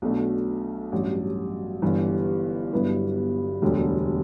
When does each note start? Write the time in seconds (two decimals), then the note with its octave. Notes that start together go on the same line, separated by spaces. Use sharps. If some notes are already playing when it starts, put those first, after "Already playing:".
0.02 B1 B2 A3 D4
0.92 A1 G2 F#3
1.82 G1 G2 E3
2.72 G1 G2 F#3 B3 E4
3.62 E1 D2 D3 G3